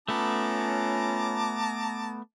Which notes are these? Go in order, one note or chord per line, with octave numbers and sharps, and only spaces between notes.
A3 B3 C#4 F4 A5 A#5 D6